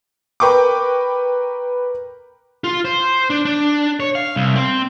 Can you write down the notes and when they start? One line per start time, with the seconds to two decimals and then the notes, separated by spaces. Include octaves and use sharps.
0.40 A#4 B4 G5 C#6 D6
2.64 F4
2.85 C5
3.30 D4
3.45 D4
4.00 C#5
4.15 F5
4.36 C2
4.56 C4